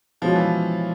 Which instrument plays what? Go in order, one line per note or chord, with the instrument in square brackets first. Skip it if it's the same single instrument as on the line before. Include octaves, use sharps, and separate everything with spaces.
[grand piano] B2 G#3 C#4 F4 [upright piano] F3
[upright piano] E3